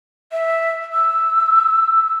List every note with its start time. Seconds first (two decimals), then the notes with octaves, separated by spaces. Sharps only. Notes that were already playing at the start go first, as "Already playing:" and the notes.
0.32 E5
0.93 E6